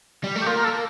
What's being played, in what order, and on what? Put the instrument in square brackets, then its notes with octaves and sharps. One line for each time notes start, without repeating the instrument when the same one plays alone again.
[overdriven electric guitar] G3
A3
[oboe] G4
[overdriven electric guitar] A#3 [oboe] F4
[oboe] A#4
A4